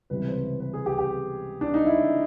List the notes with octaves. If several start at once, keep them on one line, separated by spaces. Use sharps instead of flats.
C#2 C3 E3 G3 B4
C5
B4
B4
G#4
G4
G4
D4
D#4
E4